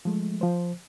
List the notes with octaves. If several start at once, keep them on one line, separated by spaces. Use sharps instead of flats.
F3 G#3 A3
F3 C5